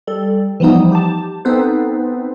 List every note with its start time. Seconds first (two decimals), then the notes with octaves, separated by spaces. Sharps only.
0.07 G3 A4
0.60 E3 F3 G3 B3 D#4
0.92 G4 A5
1.45 B3 C4 D#4 A4 B4 C5